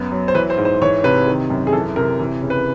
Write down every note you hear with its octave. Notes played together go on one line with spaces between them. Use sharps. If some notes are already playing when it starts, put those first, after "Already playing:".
Already playing: F#2 B3
F#3
C5
E3 B4
C5
G#2
C5
E3 C#5
C3 B4
D#3
F#2
G#4
E3 A4
C3 A#4
E3
C#3
B4